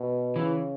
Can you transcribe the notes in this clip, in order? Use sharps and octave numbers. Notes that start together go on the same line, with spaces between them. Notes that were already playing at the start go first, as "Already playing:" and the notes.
Already playing: B2
C#3 E3